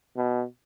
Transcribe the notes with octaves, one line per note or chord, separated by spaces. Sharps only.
B2